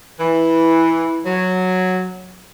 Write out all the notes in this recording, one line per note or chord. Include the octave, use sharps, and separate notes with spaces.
E3
F#3